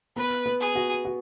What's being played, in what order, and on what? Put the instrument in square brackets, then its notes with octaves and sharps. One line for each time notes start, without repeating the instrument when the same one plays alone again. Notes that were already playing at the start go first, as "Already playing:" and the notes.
[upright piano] B3 [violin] B4
[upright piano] B3
[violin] G#4
[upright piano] F#4
F#4